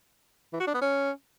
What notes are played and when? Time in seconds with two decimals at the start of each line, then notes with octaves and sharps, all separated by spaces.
0.53 E3
0.60 F#4
0.67 D4
0.74 B3
0.81 C#4